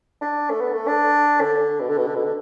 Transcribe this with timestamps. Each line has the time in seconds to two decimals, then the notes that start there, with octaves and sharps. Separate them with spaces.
0.21 D4
0.50 A3
0.61 B3
0.74 A3
0.87 D4
1.40 D3
1.80 B2
1.89 D3
1.98 B2
2.07 D3
2.15 B2
2.24 D3